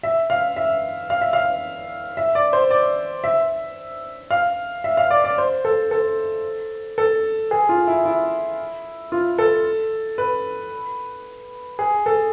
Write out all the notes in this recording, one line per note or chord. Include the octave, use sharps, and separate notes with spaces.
E5
F5
E5
F5
E5
F5
E5
D5
C5
D5
E5
F5
E5
F5
D5
D5
C5
A4
A4
A4
G#4
F4
E4
E4
F4
A4
B4
G#4
A4